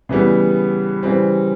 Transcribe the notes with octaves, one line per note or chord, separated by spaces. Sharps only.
C#3 E3 G3 B3
C#3 E3 G3 C4